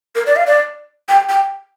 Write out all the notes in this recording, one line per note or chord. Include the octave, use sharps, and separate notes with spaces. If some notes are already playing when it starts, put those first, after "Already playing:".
A#4
D5
F5
D5
G5
G5